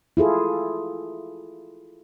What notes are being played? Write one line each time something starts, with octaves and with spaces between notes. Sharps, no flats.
E4 F4 G#4 A4